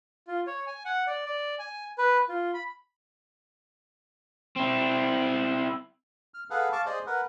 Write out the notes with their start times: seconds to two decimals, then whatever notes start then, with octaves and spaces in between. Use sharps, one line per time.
0.28 F4
0.47 C#5
0.67 G#5
0.85 F#5
1.07 D5
1.26 D5
1.59 G#5
1.98 B4
2.29 F4
2.54 B5
4.57 C4 E4
6.34 F6
6.50 G#4 A4 B4 F5 F#5
6.72 F5 A5 C#6 D6
6.86 G#4 C5 D5 D#5
7.07 A#4 B4 F#5